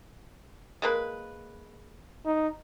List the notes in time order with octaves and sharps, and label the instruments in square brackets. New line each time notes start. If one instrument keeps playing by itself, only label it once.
[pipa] G#3 A#3 B4
[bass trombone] D#4